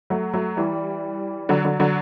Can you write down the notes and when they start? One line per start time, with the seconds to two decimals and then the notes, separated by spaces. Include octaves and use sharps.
0.10 F#3 A3
0.34 F#3 A3
0.57 E3 G3
1.49 D3 F#3
1.65 D3 F#3
1.80 D3 F#3